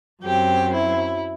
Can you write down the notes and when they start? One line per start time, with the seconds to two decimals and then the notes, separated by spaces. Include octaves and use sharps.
0.23 F#2 F#3 C4 G4
0.73 E4